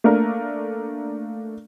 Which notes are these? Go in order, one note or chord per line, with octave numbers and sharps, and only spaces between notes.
A3 A#3 D4 A#4